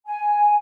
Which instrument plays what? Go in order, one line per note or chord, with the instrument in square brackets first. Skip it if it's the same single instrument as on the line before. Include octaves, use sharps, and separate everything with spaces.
[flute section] G#5